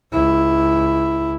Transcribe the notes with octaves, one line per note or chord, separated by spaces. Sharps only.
C#2 E4